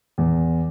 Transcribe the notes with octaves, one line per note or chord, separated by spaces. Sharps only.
E2